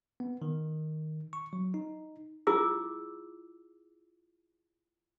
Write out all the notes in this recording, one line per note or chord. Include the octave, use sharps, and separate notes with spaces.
B3
D#3
C#6
F#3
D#4
E4 F4 G#4 D6 E6